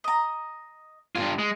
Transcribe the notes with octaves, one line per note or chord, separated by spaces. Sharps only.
D#5 A#5
G2 F4 G#5
G#3